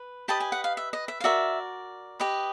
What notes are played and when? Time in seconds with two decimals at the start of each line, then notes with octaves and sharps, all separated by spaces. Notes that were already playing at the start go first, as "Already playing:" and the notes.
Already playing: B4
0.28 G4 B4 D#5 A5
0.40 G#5
0.52 F#5
0.64 F5
0.77 E5
0.93 D#5
1.08 E5
1.20 F5
1.24 F#4 A#4 D5 E5
2.20 G4 B4 D#5